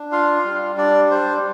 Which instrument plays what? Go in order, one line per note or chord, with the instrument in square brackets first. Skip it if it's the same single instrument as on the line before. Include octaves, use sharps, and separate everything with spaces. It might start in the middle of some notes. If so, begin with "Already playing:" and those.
Already playing: [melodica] D4
F4 F5
G3
D4 D5
G3 C5